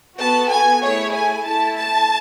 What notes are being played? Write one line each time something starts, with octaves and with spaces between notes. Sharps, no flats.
B3 F#4 A4 A5
G#5
A3 E4 G#4 C#5
G#5
A3 E4 A4 A5
A5